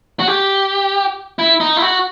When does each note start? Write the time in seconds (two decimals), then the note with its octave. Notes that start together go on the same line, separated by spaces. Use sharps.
0.20 F#4
0.28 G4
1.39 E4
1.60 D#4
1.77 E4
1.82 F#4